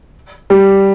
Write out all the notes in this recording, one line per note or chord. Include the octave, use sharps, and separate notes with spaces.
G3